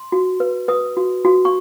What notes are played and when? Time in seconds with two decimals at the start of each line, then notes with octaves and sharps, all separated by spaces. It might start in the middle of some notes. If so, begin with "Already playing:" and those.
Already playing: C6
0.12 F#4
0.40 B4
0.68 B4 D#6
0.97 F#4
1.25 F#4
1.45 C#6